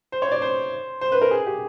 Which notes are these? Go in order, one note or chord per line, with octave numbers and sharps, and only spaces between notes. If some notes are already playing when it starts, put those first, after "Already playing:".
C5
C#5
D5
C5
C5
B4
A#4
G#4
G4